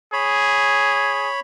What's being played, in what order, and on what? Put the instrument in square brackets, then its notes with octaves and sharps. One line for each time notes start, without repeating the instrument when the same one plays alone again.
[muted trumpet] G#4 [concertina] C#5 B5